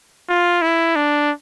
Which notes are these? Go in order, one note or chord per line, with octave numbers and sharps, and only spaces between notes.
F4
E4
D4